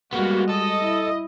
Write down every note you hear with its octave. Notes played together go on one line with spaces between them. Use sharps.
G3 G#3 A#3 B3 F#4
A4 D#5
E4